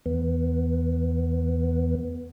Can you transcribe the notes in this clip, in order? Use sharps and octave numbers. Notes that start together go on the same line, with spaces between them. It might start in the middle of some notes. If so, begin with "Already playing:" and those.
E2 B3